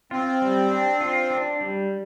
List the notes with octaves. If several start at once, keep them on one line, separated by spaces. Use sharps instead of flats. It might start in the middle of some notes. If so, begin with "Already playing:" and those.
C4 F4
G3
D4
F4
D4
G3